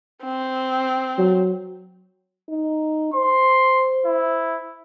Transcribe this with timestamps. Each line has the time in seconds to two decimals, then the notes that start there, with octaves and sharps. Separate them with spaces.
0.24 C4
1.18 F#3
2.49 D#4
3.14 C5 C6
4.06 E4